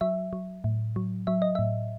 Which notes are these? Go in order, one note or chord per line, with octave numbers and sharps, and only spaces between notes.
F#3 E5
F#3
A2
F#3
F#3 E5
D#5
A2 E5